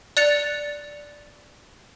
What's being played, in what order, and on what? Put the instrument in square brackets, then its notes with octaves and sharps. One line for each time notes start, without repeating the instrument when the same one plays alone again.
[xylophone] D5 F#6 A6 C#7 F7